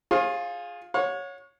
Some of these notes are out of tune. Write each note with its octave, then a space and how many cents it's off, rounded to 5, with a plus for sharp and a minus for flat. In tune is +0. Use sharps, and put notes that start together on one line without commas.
F4 +10 G#4 +0 C#5 -45
C#5 +0 F#5 -45